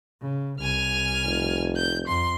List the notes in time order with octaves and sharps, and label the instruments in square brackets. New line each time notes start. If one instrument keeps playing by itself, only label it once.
[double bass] C#3
[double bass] C2 [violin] G#5 F6
[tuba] F1
[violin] G6
[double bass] F2 [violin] C6